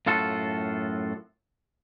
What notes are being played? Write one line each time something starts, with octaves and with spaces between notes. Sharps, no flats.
F#2 A2 F4 F#4 A4